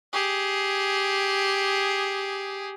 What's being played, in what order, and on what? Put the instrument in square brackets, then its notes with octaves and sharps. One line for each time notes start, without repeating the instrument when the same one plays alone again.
[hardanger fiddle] G4 G#4